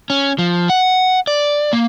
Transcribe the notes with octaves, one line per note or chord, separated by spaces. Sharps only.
C#4
F3
F#5
D5
A#3